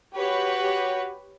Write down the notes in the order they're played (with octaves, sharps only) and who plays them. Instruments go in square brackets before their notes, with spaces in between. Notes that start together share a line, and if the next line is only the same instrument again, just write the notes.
[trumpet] F#4 [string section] G4 B4 C#5